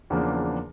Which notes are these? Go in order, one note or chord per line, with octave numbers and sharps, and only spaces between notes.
E2 C#3 F3 A#3 D4